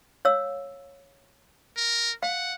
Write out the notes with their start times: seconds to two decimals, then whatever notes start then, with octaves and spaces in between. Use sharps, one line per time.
0.25 C#5 F5 E6
1.76 A#4
2.23 F5 F#5